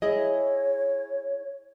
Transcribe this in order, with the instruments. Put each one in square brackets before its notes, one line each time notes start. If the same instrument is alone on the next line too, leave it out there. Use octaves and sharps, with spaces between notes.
[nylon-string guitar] E4 G#4 D#5 [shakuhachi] C#5